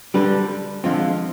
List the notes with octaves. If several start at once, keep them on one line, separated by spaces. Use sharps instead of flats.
D3 G3 D4 G4 B4
D3 F3 G#3 C4 F4